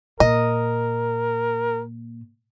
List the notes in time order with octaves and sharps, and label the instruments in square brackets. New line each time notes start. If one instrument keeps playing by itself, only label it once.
[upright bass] A#2 [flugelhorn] A#4 [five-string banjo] D#5